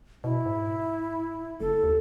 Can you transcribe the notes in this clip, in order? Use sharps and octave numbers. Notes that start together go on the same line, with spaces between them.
B2 E4
G#2
F#1 A4
D#2